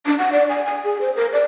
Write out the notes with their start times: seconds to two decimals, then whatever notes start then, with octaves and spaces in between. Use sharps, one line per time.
0.06 D4
0.19 F#5
0.32 D5
0.49 G#5
0.66 G#5
0.84 G#4
1.01 C5
1.16 A#4
1.32 D5